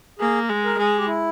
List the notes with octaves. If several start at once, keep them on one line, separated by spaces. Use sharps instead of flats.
A#3 G#4
G#3
A#4
G#3 G#4
G4
E4